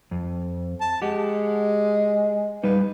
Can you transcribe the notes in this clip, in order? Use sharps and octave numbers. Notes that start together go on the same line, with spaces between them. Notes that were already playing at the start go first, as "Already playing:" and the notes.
F2
A5
G#3 G4 F#5
G3 D#4 B4